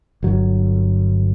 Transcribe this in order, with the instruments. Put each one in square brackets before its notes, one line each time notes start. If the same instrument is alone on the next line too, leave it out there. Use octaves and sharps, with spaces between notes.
[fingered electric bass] G1 F#3